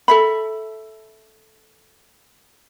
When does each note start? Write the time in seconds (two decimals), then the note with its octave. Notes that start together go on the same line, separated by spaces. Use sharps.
0.08 A4 E5 B5